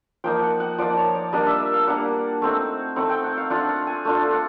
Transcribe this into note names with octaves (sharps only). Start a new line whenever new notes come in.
F3 A#3 D#4 G5
F#5
F#5
F3 A#3 D#4 D5
C#5
D5
G3 A#3 D4 D#5
E5
E5
F5
G3 A#3 D4 F#5
A3 C4 D#4
A3 C4 D#4 F#5
G5
F#5
F5
A3 D4 F4 F#5
F#5
G#5
A3 D4 F4
F#5